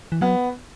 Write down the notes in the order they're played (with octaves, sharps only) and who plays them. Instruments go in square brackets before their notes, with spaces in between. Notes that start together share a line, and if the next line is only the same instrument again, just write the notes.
[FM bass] E3
[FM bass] F#3 [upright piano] B3